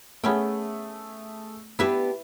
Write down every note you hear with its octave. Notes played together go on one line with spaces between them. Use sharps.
A3 B3 C#4 G#4 G5
B3 D4 E4 G4 B4 E5